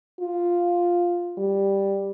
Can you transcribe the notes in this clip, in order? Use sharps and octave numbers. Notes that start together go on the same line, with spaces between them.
F4
G3